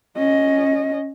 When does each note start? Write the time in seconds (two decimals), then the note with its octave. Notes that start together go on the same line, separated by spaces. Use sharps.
0.17 C#4 D#5